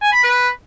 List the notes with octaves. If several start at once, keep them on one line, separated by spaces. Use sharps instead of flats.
G#5
B5
B4